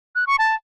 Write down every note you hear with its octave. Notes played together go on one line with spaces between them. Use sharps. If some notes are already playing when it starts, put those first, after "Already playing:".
F#6
C#6
A5